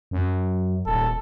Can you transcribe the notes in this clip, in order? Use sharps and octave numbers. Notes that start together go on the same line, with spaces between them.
F#2
D#1 A4